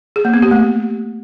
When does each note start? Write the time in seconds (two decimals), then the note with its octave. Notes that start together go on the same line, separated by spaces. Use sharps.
0.16 G#4
0.25 A#3
0.34 B3
0.42 G4
0.51 A3